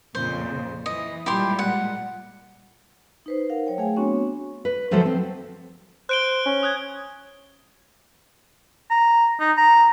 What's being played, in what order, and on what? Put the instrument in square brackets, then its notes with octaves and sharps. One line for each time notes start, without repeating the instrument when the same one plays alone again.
[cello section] F2 A#2 C#3 [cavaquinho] C5
[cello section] E3 [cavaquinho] D#5
[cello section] A#2 G3 G#3 [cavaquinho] E4 G4 C6
[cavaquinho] F#5
[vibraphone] D#4 B4 C5
D#4 A#4 F5 F#5
F#3 C#5 G5
A3 G#4 F5 G#5
B3 C4 D4 F#4 C#5 C#6
[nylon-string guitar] B4
D3 F3 F#3 A3 A4 C5
C4
[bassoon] C5 [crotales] F#6 D7 G7
[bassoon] C#4
[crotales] D#6 F#6 G#6
[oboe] A#5
D#4
A#5